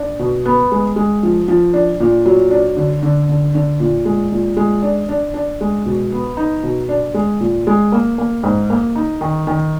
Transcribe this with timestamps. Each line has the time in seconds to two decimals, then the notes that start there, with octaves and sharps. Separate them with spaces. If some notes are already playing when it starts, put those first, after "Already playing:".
Already playing: D4
0.19 B2
0.46 B3
0.72 G#3
0.96 G#3
1.23 F3
1.48 F3
1.73 D4
2.00 A#2
2.26 F#3
2.51 D4
2.77 D3
3.03 D3
3.29 D3
3.55 D3
3.80 A#2
4.05 G#3
4.32 A#2
4.57 G#3
4.82 D4
5.09 D4
5.34 D4
5.61 G#3
5.86 B2
6.12 B3
6.37 D#4
6.63 B2
6.89 D4
7.14 G#3
7.40 A#2
7.67 G#3
7.92 A#3
8.18 A#3
8.43 G#2
8.70 A#3
8.95 D#4
9.21 D#3
9.47 D#3